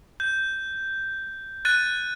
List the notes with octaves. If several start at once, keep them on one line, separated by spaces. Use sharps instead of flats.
G6
F#6 A6 D#7